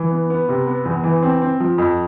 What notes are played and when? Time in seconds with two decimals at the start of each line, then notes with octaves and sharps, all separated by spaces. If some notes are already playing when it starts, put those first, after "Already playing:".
Already playing: E3
0.11 B3
0.30 B3
0.49 C3
0.67 B3
0.85 E2
1.04 E3
1.23 C4
1.42 C4
1.60 F3
1.78 F2